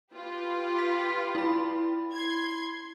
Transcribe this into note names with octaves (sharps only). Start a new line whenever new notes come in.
F4 G4 B4
B6
E4 B5
C6 G#6